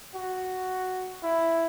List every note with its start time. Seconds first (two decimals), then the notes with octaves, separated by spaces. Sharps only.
0.15 F#4
1.23 E4